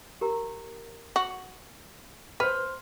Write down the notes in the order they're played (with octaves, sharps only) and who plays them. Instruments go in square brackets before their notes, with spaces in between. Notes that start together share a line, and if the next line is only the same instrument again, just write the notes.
[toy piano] G4 A#4 A#5
[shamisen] F#4
[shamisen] B4 [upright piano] C5 F6